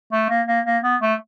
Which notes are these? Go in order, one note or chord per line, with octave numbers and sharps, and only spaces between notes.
A3
A#3
A#3
A#3
B3
A3